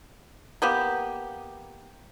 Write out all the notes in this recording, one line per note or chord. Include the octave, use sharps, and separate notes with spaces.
A#3 B3 G4